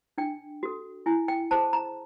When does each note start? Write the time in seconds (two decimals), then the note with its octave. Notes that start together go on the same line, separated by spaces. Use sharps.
0.18 D4 G5
0.63 F#4 A4
1.06 E4 G#5
1.28 G5
1.51 G#4 C5 A5
1.73 A#5